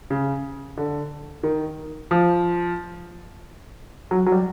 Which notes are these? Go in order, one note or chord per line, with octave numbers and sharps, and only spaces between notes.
C#3
D3
D#3
F3
F#3
F#3
G3